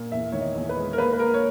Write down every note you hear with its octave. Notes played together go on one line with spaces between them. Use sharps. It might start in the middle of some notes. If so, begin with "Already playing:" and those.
Already playing: A#2
E2 E5
D#3 C#5
D#5
E2
B4
G#3
A#4
A#3 B4
B4
A#3 A#4
C#5